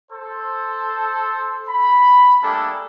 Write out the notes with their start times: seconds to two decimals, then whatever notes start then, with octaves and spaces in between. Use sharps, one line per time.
0.12 A4 C5
1.69 B5
2.43 G3 A3 A#3 D4 G#4 A4